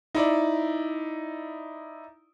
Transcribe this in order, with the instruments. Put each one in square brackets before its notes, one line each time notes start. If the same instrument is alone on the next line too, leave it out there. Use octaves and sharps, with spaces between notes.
[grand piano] D#4 E4 D5